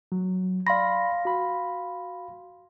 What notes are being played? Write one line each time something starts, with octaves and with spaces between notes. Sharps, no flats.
F#3
D5 F5 B5 C6 A#6
F#4 B5